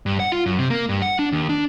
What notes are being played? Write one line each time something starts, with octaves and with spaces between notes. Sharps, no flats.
G2
F#5
F4
F#2
C3
A#3
G2
F#5
D4
D#2
D4